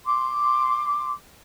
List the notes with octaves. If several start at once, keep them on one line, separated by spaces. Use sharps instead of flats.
C6 D6